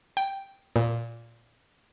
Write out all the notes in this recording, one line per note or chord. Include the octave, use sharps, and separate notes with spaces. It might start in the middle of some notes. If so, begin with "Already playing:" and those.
G5
A#2